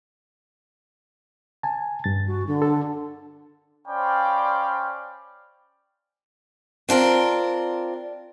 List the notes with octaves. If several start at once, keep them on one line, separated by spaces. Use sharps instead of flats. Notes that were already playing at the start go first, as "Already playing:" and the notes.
G#5 A5
G2 A6
F#4
D3
A4
C#4 C5 D5 F5 G5 B5
C4 D4 F4 A#4